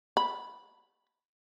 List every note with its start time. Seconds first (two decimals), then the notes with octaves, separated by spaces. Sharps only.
0.17 B5